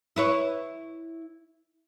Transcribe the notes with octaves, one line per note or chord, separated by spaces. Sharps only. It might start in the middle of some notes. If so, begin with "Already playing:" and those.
E4 B4 C#5